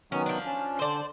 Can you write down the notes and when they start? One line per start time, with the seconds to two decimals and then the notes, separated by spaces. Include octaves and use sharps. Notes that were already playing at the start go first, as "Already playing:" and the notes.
0.12 D#3 F#3 B3 C#4
0.26 F3 D4
0.46 C#4
0.79 D3 C5 D5